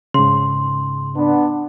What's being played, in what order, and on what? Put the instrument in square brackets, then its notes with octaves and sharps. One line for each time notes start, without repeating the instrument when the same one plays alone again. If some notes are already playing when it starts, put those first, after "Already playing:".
[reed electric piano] G#2 C#3 [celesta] C6
[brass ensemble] B3 D4